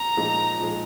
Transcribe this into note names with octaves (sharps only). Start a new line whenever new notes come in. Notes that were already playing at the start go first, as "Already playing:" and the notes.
Already playing: A#5
A#2 F3 G#3 D#4 G#4
A#2 F3 G#3 D#4 G#4